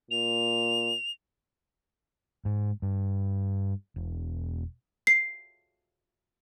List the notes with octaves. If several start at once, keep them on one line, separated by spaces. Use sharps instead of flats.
A#2 F7
G#2
G2
E1
C7